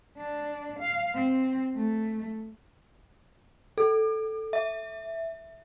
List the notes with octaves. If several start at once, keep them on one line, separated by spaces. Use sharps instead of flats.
D4
F5
C4
A3
A4
E5